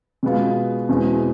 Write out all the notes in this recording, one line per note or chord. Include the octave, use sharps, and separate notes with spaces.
B2 G#3 B3 F4
E2 B2 G#3 C4 E4